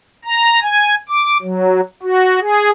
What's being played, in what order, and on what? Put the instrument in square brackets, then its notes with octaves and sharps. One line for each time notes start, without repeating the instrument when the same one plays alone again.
[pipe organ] A#5
G#5
D6
F#3
F#4
G#4